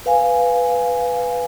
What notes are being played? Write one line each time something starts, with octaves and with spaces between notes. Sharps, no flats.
B4 F5 G#5